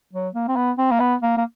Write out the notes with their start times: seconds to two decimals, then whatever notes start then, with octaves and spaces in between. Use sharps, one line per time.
0.13 F#3
0.35 A#3
0.48 C4
0.56 B3
0.78 C4
0.91 A#3
1.00 B3
1.22 A#3
1.38 A#3